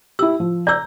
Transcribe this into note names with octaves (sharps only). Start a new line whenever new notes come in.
E4 G4 E6
F3
D5 A#5 E6 G6